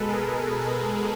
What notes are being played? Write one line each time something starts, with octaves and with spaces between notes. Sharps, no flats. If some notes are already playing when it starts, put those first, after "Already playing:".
Already playing: B2 G#3 A4 B4
G#4 A#4
A4 B4